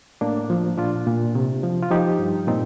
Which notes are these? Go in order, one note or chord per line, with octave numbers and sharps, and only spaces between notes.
A2 A#3 D4
F3
A#2 D4 F4
A#2
C3
F3
F4
F3 D#4 G4
G2
A#2 C4 D#4